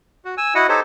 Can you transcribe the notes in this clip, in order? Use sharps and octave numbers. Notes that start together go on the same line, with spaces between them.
F#4
G#5 E6
E4 F#4 D#5 F#5
D#4 G4 A4 C5 C#5